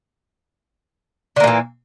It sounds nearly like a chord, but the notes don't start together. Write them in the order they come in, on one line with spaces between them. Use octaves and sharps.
D3 A#3 A#2 E3